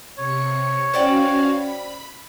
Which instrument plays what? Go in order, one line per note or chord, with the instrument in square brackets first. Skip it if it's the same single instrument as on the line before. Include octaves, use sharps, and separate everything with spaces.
[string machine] C3 C#7 [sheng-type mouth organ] C#5
[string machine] C#4 F#4 F5 [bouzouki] C5 D5 G5
[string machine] B5